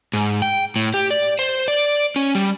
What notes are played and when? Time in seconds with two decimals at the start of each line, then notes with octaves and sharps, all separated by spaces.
0.13 G#2
0.42 G5
0.76 A2
0.94 G4
1.11 D5
1.39 C5
1.68 D5
2.16 C#4
2.35 G3